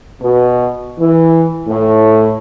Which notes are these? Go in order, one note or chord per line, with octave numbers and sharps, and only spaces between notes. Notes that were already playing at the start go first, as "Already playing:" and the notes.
B2
E3
A2